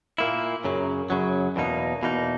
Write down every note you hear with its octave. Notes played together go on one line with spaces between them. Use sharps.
A#2 A#3 E4
F#2 C#3 F#3
F#2 C#3 F#3
E2 B2 A#3 D#4
E2 B2 A#3 D#4